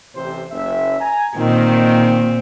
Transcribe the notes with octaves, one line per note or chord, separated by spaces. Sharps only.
A1 C3 C5
F#1 E5
G#5 A#5
A#2 D#3 C4